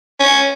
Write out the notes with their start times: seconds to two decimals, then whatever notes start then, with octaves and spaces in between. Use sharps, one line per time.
0.20 C#4